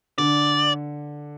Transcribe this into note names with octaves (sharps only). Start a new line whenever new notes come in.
D3 D5